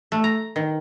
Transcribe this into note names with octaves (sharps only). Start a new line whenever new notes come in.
A3
A#5
D#3